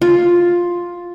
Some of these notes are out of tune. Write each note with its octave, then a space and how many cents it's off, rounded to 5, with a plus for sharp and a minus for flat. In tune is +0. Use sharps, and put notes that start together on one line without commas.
F4 +5